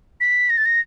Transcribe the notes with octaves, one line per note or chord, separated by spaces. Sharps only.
B6
A#6
A6
A#6